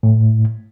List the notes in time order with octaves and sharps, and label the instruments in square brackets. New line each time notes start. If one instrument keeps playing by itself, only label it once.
[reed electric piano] A2